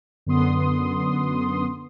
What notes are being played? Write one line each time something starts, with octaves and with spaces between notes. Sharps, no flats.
F#2 D3 B3 C6 D#6